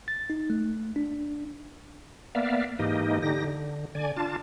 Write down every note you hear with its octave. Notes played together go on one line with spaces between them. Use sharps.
A6
D#4
A3
D4
A#3 B3 D5 E5 F5
G#2 E3 A#3 D#4 G4 D#5
D3 D#4 G4 A#6
D3
D3 D5 G#5
D4 F4 A5